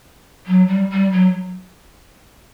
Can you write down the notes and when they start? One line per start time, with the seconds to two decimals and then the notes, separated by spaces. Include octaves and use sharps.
0.47 F#3
0.68 G3
0.91 G3
1.12 F#3